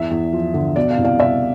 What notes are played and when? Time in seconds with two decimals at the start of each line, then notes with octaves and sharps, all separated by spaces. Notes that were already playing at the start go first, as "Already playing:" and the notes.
Already playing: E2 E5
0.11 E2
0.33 F3
0.54 D3
0.76 B2 D5
0.91 F5
0.98 C2
1.05 F5
1.19 C2 E5